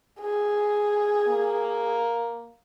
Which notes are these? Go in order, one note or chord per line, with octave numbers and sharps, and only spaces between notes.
G#4
A#3